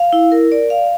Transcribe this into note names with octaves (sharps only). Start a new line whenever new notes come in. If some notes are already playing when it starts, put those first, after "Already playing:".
Already playing: F5
E4
A#4
D5
F5